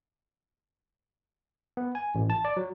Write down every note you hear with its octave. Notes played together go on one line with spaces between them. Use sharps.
B3
G#5
A1
A5
D5
F#3